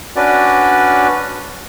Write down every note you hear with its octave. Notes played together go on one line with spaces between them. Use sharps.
C#4 D4 F#4 B4 D5